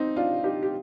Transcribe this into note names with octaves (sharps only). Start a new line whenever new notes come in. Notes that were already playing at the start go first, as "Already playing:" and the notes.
Already playing: C4 D#4
D4 F4
D#4 G4
G4